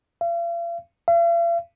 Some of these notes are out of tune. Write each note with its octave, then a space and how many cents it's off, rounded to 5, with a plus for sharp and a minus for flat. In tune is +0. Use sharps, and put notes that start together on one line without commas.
F5 -40
F5 -45